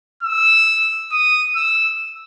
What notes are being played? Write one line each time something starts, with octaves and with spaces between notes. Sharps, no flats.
E6
D#6
E6